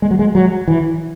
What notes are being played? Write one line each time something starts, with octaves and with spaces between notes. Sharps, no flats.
G#3
F#3
G#3
F#3
E3